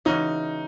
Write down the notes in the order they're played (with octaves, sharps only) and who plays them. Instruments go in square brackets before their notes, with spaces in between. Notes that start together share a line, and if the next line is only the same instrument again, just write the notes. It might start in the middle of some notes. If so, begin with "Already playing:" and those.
[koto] C#3 E3 G#3 C#4 F#4 [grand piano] D#4